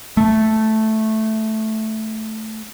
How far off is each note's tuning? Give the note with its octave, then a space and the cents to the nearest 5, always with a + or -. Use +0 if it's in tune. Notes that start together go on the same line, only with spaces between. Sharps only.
A3 -5